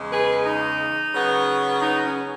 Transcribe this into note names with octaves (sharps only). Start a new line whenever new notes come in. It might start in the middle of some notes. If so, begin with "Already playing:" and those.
Already playing: E2 C#3 G#3
G#4 B4
D#4
C#3 F#3 B3
D#4
C#4